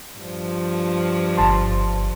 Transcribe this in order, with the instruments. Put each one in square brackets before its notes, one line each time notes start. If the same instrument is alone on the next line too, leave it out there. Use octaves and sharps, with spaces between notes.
[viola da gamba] G2 F3
[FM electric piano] G1 A5 C6